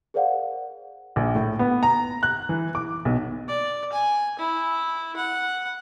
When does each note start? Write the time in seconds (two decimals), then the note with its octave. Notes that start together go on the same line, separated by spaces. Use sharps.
0.14 G#4 A#4 C5 D5 F5 F#5
1.16 A#1
1.35 A2
1.59 B3
1.83 A#5
2.23 F#6
2.49 E3
2.75 D6
3.05 B1
3.48 D5
3.92 G#5
4.39 E4
5.16 F#5